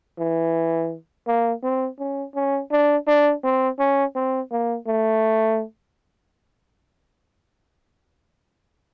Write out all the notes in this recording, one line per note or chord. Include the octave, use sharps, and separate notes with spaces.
E3
A#3
C4
C#4
C#4
D4
D4
C4
C#4
C4
A#3
A3